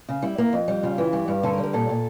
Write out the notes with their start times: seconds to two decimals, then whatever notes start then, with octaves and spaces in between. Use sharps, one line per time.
0.09 C#3
0.22 G3 E4
0.38 A#3
0.53 F2
0.68 G3
0.83 C#3 F4
0.98 E3
1.13 G2 G4
1.28 G2
1.43 D3 A4
1.53 A#4
1.58 G3
1.63 A#4
1.73 A#2 A4
1.89 A#2